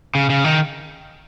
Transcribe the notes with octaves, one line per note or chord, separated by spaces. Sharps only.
C#3
C#3
D#3